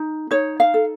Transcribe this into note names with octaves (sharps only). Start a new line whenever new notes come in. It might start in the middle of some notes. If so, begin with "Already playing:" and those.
Already playing: D#4
D#4 C#5
F5
A4